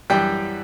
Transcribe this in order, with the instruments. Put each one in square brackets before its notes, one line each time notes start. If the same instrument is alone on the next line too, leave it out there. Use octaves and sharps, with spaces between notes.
[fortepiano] F#2 E3 G3 G5